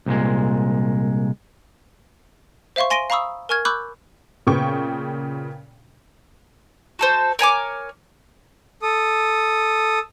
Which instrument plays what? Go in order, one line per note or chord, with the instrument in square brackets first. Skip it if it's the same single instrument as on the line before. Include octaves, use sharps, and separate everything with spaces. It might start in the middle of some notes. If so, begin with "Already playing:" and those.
[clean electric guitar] C2 A#2 G#3
[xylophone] C5 E5 F5 C6 C#6
G#5 C6 A#6 D7 D#7 G7
F5 A#5 B5 C#6 D#6 E6
A#4 G#5 C#6 F6 G#6
B5 C#6 D6 E6 F#6 G6
[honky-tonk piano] A#2 C#3 B3 G5 C#6
[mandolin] F#4 A4 C5
A#4 C#5 G#5 D6
[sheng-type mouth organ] A4 D#6